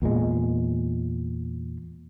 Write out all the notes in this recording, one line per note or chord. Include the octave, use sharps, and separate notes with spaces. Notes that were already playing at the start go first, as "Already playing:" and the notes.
E2 A#2 G#3